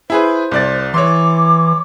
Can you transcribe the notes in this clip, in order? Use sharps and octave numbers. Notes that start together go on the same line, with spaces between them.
E4 G#4 B4 C5
C2 D5 A6
E3 C#5 C6 D6